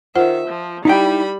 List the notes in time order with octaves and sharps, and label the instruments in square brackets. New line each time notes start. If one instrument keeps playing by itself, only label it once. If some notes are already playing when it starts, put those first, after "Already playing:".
[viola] D#3 E5 [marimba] F4 C5 F#5
[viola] F3
[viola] G3 B5 [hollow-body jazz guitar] D#4 E4 G5